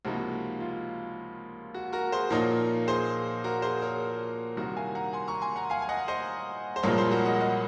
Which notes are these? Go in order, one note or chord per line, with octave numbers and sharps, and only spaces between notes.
C#2 C3 F3 A#3 D#4 F#4
F4
F#4
F#4 A#4
G#4 C5
A#2 F3 A#3 D#4 A#4 C#5
G#4 C5
F#4 A#4
G#4 C5
A#4 C#5
C2 C3 D#3 F#4 A#4
F5 G#5
F#5 A#5
G#5 C6
A#5 C#6
G#5 C6
F#5 A#5
F5 G#5
G#5
D#5 F#5
C5 D#5
C5
C2 A#2 F3 G#3 A#4 C#5
G#4 C5
F#4 A#4
D#5 F#5
D#5 F#5